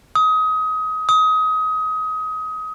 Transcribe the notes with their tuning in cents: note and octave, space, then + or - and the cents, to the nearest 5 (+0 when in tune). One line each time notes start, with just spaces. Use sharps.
D#6 +25
D#6 +25